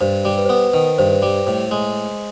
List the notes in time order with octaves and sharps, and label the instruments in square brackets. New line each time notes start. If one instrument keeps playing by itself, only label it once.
[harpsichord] G2 [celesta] C5
[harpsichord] G3
[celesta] B4
C5
[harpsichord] B3 [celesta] B4
[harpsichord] D#3 [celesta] B4
[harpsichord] G2 [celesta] C5
[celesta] B4
[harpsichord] G3
[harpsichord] A2 [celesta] C5
[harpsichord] G#3